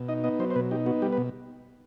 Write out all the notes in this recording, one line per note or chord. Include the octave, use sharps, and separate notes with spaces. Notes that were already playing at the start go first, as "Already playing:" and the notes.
Already playing: B2
D#4 D#5
B3 D#5
F#3 C5
C5
B2 B4
D#4 G4
B3 F#4
G3 G4
B4
B2